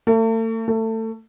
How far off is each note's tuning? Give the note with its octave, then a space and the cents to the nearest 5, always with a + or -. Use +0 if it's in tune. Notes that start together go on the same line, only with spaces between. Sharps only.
A3 +40
A3 +25